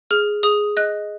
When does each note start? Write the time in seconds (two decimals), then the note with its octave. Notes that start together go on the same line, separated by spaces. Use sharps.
0.11 G#4 F6
0.43 G#4 D#6
0.77 D#5 F#6